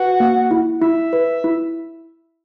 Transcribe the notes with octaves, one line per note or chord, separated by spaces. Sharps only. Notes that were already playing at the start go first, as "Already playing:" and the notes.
Already playing: F#4 B4
A#3
E4
E4 E5
B4
E4